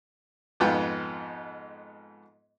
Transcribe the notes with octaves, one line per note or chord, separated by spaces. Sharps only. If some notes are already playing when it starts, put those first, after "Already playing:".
F2 G#2 B3 F4 G5